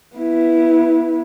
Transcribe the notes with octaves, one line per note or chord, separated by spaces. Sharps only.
B3 E4